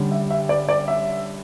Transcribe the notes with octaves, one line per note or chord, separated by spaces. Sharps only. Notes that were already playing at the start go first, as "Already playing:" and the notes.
Already playing: D3 G3 C#4
E5
E5
D5
D5
E5